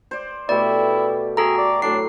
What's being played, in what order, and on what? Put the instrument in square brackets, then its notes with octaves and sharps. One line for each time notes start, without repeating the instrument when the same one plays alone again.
[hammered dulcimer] C5 D5
[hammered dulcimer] B2 A3 G4 [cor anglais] E4 [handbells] D5
[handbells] F#4 A4 A#5 [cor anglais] G#4
[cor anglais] D5
[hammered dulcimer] A2 F#3 [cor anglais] D4 [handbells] C7